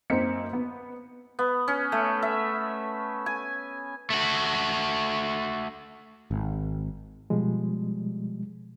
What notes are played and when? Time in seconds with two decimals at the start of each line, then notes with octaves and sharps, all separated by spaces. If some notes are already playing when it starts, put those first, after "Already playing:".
0.10 F#2 A#3 C4 D#4 B6 C#7
0.53 B3
1.39 B3
1.68 C#4
1.92 A3
2.22 E5
3.26 G#5
4.10 A3 F#4
6.31 G#1
7.30 B2 F3 G3 G#3